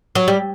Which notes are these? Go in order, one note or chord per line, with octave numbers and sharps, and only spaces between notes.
F#3
G3